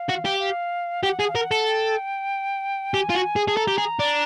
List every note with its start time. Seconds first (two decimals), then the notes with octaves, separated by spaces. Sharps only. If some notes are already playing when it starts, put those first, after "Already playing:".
Already playing: F5
0.09 F#4
0.25 G4
0.40 F5
1.03 G4 F#5
1.19 G#4
1.29 F5
1.35 A#4 F#5
1.51 A4
1.67 G5
2.94 G4 G#5
3.10 F4
3.15 F#4
3.36 G#4
3.48 G#4 A5
3.57 A4 A#5
3.68 G4
3.78 G#4
3.99 D4